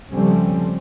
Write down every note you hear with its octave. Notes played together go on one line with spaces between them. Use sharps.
C#3 F3 G3 A3 C4 C#4